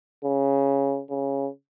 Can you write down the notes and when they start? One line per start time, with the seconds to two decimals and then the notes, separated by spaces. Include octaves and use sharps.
0.25 C#3
1.10 C#3